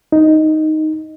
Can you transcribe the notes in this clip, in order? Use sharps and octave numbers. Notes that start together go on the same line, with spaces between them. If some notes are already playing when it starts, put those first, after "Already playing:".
D#4